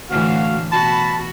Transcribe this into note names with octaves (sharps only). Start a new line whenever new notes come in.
A2 D3 E3 F#4 F5
B2 F#4 A5 B5